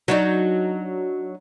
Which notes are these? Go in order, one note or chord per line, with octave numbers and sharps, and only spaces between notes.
F#3 D4 D#4